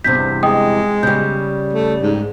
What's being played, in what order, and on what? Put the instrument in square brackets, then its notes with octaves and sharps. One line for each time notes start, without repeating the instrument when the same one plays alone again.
[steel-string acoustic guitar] E2 G2 C3 [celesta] G6 B6
[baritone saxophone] G#3 [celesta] D#5 G5 D#6
[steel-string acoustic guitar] C#3 G3 [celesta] G6
[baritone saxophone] A3
G#2